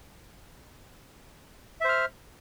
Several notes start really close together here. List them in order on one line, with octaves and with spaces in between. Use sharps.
E5 C5 F6